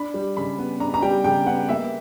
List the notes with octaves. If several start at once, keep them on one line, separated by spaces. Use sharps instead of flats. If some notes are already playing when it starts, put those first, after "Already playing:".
Already playing: D4 B5
G3
C#3 B5
B3
D4 A#5
A#5
G3 G5
C#3 G5
B3 F#5
A#3 E5